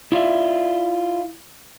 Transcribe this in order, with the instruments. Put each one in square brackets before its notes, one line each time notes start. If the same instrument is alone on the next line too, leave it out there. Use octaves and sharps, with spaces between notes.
[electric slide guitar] E4 F4 D5 E5